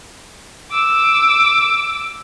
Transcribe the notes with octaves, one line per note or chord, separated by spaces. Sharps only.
D6 E6